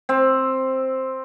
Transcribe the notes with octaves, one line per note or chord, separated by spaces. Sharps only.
C4